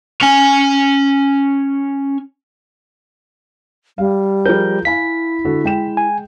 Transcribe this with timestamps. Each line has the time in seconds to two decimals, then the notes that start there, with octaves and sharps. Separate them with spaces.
0.21 C#4 G#5
3.98 G3 F5
4.46 F3 G#4 A#4 G6
4.85 E4 F5 G#5 B5 B6
5.45 D3 F#4 A4
5.64 G#3 G5 E7
5.97 G#5